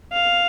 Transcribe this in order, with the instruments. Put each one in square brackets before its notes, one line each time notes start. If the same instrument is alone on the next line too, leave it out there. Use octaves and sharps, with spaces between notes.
[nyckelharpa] F5